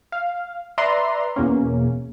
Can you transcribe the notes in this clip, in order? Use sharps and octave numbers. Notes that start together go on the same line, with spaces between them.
F5
B4 D5 E5 A#5 C6
E2 B2 A#3 C#4